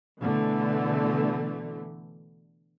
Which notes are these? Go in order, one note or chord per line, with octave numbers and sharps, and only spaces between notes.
B2 D3 E3 A3